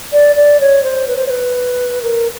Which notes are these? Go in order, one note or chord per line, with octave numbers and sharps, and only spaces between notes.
D5
D5
C#5
C5
B4
C5
C#5
B4
A#4